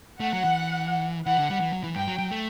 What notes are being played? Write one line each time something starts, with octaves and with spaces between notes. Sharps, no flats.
A3 F#5
F#3
E3
E3 F#5
D3
G3
E3
F#3
E3
G2 G5
F#3
F#3
A3